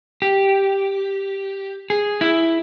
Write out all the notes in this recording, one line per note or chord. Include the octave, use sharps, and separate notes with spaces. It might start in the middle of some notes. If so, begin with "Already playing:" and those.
G4
G#4
E4